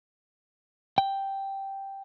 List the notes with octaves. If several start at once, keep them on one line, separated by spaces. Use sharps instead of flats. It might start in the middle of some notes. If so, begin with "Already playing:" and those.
G5